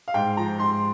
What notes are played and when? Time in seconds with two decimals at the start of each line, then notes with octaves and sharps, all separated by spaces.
0.08 F5
0.14 G#2 G5
0.37 F3 A#5
0.59 G#2 C6